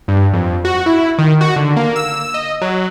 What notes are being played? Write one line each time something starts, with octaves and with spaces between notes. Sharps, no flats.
G2
F2
F#4
E4
D#3
F#4
D3
A#3
E6
D#5
F#3